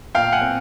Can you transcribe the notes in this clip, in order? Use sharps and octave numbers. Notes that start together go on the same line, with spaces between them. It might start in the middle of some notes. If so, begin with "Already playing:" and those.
A#2 F5 G5
F#5 G#5
C4